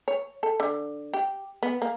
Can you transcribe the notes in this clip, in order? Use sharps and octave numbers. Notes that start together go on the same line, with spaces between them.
C#5
A4
D3
G4
B3
A#3